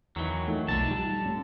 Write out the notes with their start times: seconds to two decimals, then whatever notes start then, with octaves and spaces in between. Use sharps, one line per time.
0.16 E2 D#3 E3 F#3
0.48 F3 A3 D#4
0.68 B1 D3 A5
0.91 G3
1.26 G2 A3 C#4